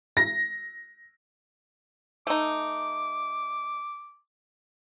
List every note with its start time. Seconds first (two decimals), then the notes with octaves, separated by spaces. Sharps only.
0.17 A#6
2.27 A3 D#4 D6